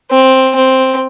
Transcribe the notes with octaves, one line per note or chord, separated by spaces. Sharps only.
C4
C4